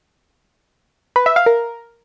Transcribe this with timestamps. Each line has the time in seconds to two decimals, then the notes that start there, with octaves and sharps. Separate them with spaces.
1.16 B4
1.26 E5
1.36 F5
1.46 A#4